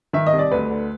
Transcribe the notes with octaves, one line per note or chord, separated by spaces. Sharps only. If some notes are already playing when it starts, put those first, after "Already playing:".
D#3 E5
D#5
C2
D5
D2 B4
D3